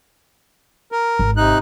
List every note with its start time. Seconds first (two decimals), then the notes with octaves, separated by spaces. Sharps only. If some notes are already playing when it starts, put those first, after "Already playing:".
0.92 A#4
1.19 G#1
1.37 C3 D#4 F#6